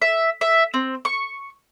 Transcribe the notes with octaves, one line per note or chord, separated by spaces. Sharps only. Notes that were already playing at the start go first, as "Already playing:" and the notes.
E5
E5
C4
C#6